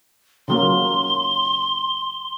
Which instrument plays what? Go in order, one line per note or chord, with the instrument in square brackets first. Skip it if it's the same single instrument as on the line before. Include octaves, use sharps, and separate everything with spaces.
[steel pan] C#3 F#3 A#3 [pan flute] C6